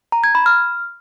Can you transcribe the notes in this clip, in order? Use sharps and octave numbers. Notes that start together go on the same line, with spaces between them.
A#5
G#6
B5
F6